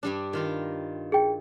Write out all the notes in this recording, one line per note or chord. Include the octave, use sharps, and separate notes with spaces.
G2 G3 D4
D#3 F4 A#4
G#4 G5